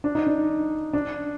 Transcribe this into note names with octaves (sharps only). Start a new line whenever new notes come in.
D4
D#4
D4
D4